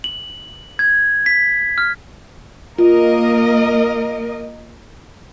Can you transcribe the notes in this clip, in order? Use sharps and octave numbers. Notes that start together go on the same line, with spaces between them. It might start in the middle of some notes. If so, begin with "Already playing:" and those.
F#7
G#6
B6
F6
A#3 F4 A#4 D#5